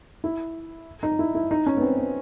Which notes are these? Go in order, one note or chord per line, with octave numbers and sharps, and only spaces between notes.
E4
D#4
E4
E4
D#4
C#4
B3
C4
B3